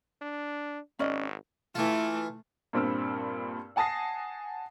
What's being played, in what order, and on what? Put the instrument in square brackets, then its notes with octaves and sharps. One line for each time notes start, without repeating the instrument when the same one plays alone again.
[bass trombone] D4
[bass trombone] G#1 [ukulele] C#4 D5 D#5
[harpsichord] E3 F4 [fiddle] A3
[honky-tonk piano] G2 A#2 C4 B5 E6 F6
F#5 G#5 A5 D#6 A#6 C7